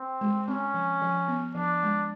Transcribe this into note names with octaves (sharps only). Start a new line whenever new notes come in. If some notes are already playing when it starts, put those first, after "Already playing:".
Already playing: C4
G#3
C4 C#4
F3
F3
B3
F3 D4
G#3